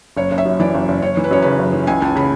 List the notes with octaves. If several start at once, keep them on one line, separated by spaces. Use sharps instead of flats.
F#1 C#5
F#1
E5
F#2
E3 D5
F#1
F#1
F#1 C#5
E3
B4
F#2 C#5
C#3 B4
F#1
E3
C#2 G#5
C#2 A5
C#3 B5